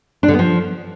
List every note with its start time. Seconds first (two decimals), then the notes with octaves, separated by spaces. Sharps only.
0.23 D4
0.28 D3
0.34 B3
0.39 F3